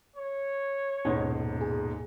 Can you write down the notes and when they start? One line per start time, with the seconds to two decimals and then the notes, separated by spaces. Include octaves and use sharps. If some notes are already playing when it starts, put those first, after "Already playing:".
0.16 C#5
1.05 D#1 G#2 B2 C#4
1.61 G#4